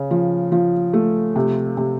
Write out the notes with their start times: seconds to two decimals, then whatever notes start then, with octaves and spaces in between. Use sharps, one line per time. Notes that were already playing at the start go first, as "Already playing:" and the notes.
Already playing: C#3
0.11 F3
0.52 F3
0.93 A3
1.36 C3
1.77 C3